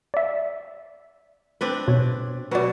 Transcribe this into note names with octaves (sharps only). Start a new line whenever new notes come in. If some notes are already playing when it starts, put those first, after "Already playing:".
D5 E5
C4 D4 B4
B2 C#5
B2 F#3 B4 D5